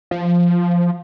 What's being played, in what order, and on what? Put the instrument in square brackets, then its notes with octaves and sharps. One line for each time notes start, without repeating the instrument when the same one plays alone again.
[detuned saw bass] F3